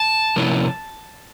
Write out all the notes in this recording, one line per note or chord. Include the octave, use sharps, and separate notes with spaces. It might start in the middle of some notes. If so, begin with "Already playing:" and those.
Already playing: A5
C3 F3 A#3 C#4 E4